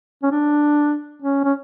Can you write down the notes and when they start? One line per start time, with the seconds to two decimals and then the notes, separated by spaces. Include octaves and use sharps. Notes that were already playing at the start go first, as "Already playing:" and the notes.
0.23 C#4
0.31 D4
1.22 C#4
1.44 C#4